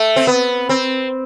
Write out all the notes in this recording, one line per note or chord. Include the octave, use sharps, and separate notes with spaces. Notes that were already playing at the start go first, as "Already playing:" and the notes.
Already playing: A3
C4
B3
C4